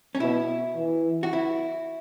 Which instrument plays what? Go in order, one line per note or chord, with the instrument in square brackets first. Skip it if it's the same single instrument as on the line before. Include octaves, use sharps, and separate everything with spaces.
[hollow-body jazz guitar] C#4
[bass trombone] B2 [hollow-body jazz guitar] E4
[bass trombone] E3
[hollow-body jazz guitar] F#4
E4